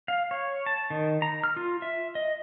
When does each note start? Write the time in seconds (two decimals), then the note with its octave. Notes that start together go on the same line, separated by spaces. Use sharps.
0.08 F5
0.31 C#5
0.66 A5
0.90 D#3
1.22 A#5
1.44 F6
1.57 F4
1.82 E5
2.15 D#5